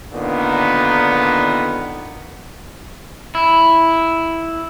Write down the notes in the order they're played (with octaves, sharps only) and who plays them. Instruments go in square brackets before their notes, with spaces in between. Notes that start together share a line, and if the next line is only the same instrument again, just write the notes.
[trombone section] A#2 D3 D#3 B3
[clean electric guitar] E4